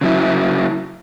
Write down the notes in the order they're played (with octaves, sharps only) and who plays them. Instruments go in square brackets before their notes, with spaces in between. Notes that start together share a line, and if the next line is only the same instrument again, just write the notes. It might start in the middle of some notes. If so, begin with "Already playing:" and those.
[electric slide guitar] C#3 F#3 E4